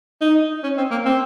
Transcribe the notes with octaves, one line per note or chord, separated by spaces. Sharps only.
D#4
C#4
C4
A#3
C4